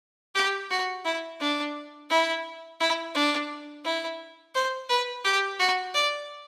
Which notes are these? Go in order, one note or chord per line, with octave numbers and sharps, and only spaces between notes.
G4
F#4
E4
D4
E4
E4
D4
E4
C5
B4
G4
F#4
D5